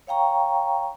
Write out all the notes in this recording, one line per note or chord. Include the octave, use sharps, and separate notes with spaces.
C#5 F5 G5 A#5 C#6